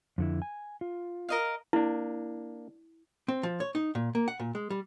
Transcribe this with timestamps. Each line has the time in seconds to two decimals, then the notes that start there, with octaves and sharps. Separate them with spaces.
0.18 F2 D3 E4
0.42 G#5
0.81 F4
1.29 A#4 D#5 F5
1.73 A#3 D4 E4
3.28 C4
3.43 F3
3.60 C#5
3.75 D#4
3.95 A#2
4.15 A#3
4.28 F#5
4.40 A#2
4.55 G#3
4.70 G3